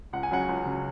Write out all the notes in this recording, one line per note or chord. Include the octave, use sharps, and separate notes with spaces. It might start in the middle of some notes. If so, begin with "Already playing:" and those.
C#2 F#5
G#5
C#3 F#3 F#5
C#2
C#3 F#3